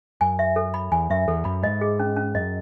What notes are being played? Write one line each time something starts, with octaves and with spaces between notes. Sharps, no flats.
F#2 G#5
E5
A4
B5
E2 G#5
F#2 E5
E2 A4
F#2 B5
G#2 D#5
G#4
C#4
C#4
F#2 D#5